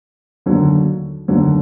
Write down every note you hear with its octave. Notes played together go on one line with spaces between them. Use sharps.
D#2 D3 F#3
D#2 D3 F#3